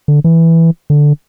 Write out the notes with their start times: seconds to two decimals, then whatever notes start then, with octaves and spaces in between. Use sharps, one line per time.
0.08 D3
0.24 E3
0.90 D3